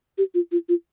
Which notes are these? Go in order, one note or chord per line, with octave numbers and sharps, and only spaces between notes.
G4
F4
F4
F4